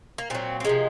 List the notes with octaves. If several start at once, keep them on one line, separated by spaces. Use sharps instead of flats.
A#3
A#2 F#3 C4
C4
C3 F3 G#3 A#3